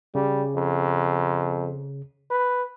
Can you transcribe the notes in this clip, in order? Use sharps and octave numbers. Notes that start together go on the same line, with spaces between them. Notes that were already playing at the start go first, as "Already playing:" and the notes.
C#3 G3
F2
B4